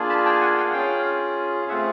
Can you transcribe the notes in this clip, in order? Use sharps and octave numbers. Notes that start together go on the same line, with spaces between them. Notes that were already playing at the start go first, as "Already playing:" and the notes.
Already playing: A#3 D4 F4 G#4
A5 B5
G5 A5
F#5 G#5
F5 G5
F#5
C#4 F4 G#4 F5 G5
F5
A3 C4 F4 G#4 E5 F#5